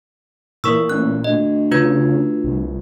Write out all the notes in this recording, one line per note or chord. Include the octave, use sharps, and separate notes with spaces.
A#2 E3 A#4 C#6 E6
A1 F#6
D2 D#5
C#3 F4 B4 G#6
C2